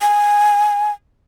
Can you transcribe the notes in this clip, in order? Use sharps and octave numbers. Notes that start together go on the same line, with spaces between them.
G#5